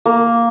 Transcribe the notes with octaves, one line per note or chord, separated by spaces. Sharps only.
A#3